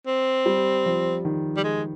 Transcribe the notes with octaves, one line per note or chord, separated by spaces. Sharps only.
C4
G3
F3
D#3
G3
G#3